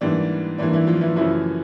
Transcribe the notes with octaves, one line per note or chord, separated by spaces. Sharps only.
G#2 E3 G3 A#3 D4
G#2 E3 G3 A#3 D4
E3 E4
F3 F4
E3 E4
F#2 C#3 E3 F3 A3 E4